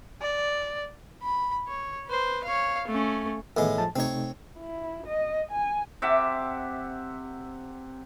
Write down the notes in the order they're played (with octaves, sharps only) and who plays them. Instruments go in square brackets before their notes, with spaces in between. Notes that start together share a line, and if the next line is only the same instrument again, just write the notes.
[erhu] D5
[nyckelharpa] B5
C#5
B4 C5
C#5 F5
A3 C#4
[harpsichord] A2 G#3 [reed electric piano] D#3 E3 B3
[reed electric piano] F3 A5
[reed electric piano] C3 A3 D#4 [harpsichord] C4 C#5
[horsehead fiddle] E4
D#5
G#5
[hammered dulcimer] C3 E5 F#5 D6